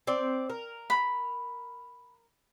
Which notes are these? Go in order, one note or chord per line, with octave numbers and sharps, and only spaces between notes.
C4 D5
A#4
B5